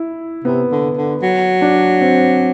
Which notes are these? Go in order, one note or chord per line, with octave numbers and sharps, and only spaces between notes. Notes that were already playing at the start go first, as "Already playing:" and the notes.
Already playing: E4
C3 B3
D3
D3
F#3
D4
C4